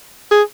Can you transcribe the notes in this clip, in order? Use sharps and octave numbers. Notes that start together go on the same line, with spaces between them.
G#4